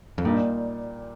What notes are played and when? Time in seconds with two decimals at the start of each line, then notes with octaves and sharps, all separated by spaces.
0.18 F2
0.25 G2 A#2 G3 A#3 D#4 G4